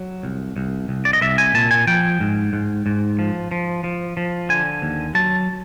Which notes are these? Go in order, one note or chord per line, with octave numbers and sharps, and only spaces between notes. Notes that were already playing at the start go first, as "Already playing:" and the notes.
Already playing: F#3
C2
C2
C2
D5
D#5
C2 E5
G#5
A#2 A5
G#5
F3 G5
G#2
G#2
G#2
F3
F3
F3
F3
D3 G#5
D#2
F#3 A5